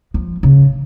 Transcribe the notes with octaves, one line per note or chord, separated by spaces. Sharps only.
F3
C#3